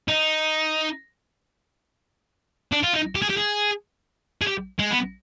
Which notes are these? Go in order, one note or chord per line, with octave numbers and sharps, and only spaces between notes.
D#4
D4
F4
D#4
G4
G#4
G4
G#4
G#4
G4
G#3
B3